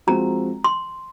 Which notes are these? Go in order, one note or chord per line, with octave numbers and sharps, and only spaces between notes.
F3 G#3 C4 F#4 A#5
C6